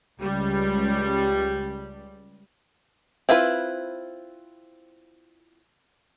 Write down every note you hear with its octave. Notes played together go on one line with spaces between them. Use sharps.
C#2 G3
C4 E4 F4 B4